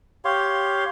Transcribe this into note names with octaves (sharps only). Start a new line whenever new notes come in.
G4 C#5 F5 C6